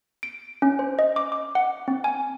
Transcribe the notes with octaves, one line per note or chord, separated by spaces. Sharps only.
D7
C#4
C5
D#5
D6
D6
F#5
C4
G#5